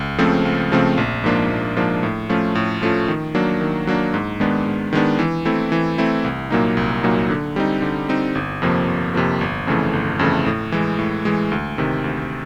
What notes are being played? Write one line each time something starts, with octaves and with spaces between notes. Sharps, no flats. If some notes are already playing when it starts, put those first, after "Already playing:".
Already playing: C#2
C#3 F3 A3 C4
C#2
C#3 F3 A3 C4
A#1
G#2 F3 A#3 D4
A#1
G#2 F3 A#3 D4
A2
F3 A3 C#4 F4
A2
F3 A3 C#4 F4
D#3
F#3 A#3 D4
D#3
F#3 A#3 D4
G#2
D#3 G#3 B3 D4
G#2
D#3 G#3 B3 D4
E3
A3 C4 E4
E3
A3 C4 E4
C2
A#2 F#3 A#3 D#4
C2
A#2 F#3 A#3 D#4
D3
G3 C4 D#4
D3
G3 C4 D#4
G1
F2 C3 F3 A#3
G1
F2 C3 F3 A#3
G1
F2 C#3 E3 A3
G1
F2 C#3 E3 A3
A2
E3 G#3
A2
E3 G#3
D2
C3 D#3
D2